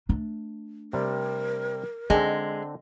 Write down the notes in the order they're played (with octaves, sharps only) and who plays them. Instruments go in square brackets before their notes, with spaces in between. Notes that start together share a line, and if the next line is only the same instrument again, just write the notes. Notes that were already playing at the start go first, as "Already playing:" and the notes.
[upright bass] A3 D4
[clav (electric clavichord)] C3 G3 [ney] A#4
[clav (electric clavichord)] D3 C4 [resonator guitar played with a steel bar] G#3 [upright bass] D#4